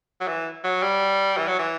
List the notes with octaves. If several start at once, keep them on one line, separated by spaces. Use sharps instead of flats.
F#3
E3
F#3
G3
E3
F#3
E3